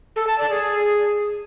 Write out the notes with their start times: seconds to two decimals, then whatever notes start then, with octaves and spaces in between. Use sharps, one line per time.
0.16 A4
0.27 A5
0.38 D5
0.50 G#4